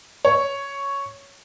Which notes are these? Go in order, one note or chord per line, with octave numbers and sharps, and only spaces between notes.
C#5